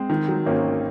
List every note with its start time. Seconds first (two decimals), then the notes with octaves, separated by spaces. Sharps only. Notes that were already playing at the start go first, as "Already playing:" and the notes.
Already playing: G#3 C4
0.10 D#3
0.28 F#3
0.46 G#1 A#3 C#4